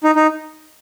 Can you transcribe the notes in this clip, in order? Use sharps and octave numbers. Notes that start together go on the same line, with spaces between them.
D#4
D#4